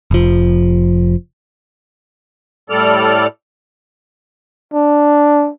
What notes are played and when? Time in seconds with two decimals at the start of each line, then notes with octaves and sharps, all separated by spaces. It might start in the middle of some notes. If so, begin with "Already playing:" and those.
0.11 F1 F3
2.70 A2 G3 A4 D5 F6
4.74 D4